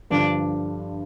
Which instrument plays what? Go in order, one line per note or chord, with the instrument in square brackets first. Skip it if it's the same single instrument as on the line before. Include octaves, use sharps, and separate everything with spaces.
[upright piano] G2 D3 F3 [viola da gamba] D4